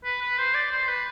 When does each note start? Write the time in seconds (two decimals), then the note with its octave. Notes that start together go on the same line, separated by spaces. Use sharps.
0.04 B4
0.21 B4
0.39 C5
0.54 D5
0.71 C5
0.88 B4